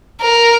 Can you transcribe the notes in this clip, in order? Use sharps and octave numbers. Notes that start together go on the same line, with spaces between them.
A#4